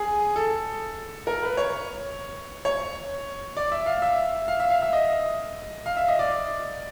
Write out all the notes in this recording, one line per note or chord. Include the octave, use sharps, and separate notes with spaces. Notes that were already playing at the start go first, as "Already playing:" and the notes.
Already playing: G#4
A4
A#4
B4
C#5
C#5
D5
E5
F5
E5
F5
E5
F5
E5
D#5
F5
E5
D#5
D5